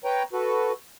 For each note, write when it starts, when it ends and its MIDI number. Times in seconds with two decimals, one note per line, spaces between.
0.04 0.23 71
0.04 0.23 73
0.04 0.23 79
0.04 0.23 82
0.33 0.72 66
0.33 0.72 69
0.33 0.72 71